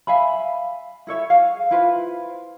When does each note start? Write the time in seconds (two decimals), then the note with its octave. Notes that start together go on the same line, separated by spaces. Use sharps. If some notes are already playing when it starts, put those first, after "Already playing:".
0.07 E5 F5 G#5 B5
1.07 E4 A4 C#5 E5
1.30 G#4 F5
1.71 E4 F4 B4 C5